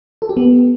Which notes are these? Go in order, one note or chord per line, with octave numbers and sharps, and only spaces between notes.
A4
G4
B3